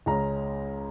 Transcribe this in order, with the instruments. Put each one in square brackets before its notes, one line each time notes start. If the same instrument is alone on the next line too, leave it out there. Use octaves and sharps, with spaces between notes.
[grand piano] C#2 C#3 G#3 C#4 A#5